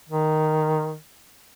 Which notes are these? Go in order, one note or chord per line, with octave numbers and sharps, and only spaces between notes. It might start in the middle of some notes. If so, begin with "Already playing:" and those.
D#3